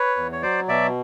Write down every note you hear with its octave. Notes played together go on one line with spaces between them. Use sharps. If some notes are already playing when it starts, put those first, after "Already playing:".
Already playing: B4 C#5
E2
C#5
F#3 C5 D5
B2 D5 E5